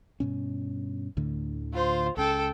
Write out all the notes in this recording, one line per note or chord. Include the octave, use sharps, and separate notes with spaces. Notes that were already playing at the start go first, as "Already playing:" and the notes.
G2 B2 C#4
D2 A2 D3
F4 C5
C#2 C#3 A4 G5